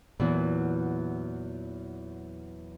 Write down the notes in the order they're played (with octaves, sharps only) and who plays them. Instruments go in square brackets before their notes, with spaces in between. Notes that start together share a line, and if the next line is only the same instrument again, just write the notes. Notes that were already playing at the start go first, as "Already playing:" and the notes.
[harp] E2 F#3 [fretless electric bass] A#2 E3